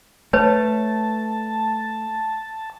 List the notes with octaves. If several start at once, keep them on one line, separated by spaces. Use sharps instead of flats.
A3 B4 C#5 A5